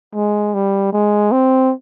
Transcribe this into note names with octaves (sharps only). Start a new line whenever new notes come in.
G#3
G3
G#3
C4